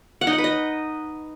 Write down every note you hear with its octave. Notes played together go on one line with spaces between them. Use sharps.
F#5
D#4
F#5
B4
D#5